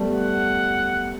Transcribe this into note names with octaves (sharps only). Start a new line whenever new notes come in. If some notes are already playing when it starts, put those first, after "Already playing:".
Already playing: G3 A3 B3
F#5